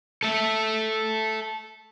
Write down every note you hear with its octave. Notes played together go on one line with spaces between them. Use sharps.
A4 E5